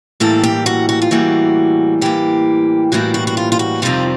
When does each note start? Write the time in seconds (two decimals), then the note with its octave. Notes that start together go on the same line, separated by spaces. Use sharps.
0.20 A2 E3 G3 A#3 A4
0.43 G4
0.66 F#4
0.89 F#4
1.02 F4
1.11 A2 E3 G3 A#3 F#4
2.01 A2 E3 G3 A#3 G4
2.92 A2 E3 G3 A#3 F#4
3.14 F#4
3.27 F#4
3.37 F4
3.52 F4
3.59 F#4
3.82 F2 C3 D#3 G3 C4 F4